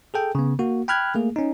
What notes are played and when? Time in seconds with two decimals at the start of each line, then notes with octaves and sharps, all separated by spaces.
0.14 G#4 A4 G5
0.35 C#3 B3
0.59 A#3 F#4
0.88 G5 B5 F6 F#6 G#6
1.15 A3 A#3 G#4
1.36 C#4 D#4